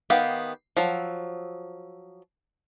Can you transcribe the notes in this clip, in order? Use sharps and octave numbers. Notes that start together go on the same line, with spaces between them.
D#3 B3 G4 F5
F3 F#3